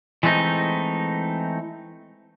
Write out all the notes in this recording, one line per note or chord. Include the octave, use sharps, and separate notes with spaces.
E3 G#3 A3 C4 D#4